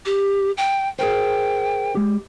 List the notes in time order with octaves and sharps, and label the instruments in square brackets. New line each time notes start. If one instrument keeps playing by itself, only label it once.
[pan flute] G4
G5
[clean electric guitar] G#4 A#4 C5 [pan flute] G5
[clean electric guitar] G#3 G4